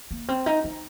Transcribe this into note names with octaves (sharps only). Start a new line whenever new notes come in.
A#3
C4
D#4
D#4